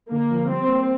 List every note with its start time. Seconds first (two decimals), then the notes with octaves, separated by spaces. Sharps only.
0.11 D3 A#3
0.30 F3
0.49 G3 C4
0.68 A#3